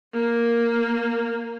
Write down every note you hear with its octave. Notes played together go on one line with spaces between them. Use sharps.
A#3